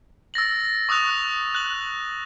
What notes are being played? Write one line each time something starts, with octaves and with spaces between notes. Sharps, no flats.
E6 A6 A#6 F#7
C#6 D#6 E6 F#6 F7
F#6 F#7